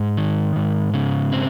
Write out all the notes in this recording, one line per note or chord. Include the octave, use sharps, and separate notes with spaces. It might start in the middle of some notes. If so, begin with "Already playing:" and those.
Already playing: G#2
D#3
G#2
C#3
C4